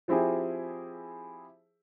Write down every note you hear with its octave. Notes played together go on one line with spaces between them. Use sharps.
F3 C4 E4 G4 G#4